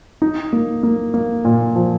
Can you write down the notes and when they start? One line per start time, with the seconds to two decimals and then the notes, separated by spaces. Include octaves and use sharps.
0.22 D#4
0.53 A#3
0.83 A#3
1.14 A#3
1.45 A#2
1.75 F3